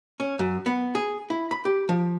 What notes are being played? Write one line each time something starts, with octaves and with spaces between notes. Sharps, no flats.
C#4
F#2
B3
G#4
E4
B5
G4
F3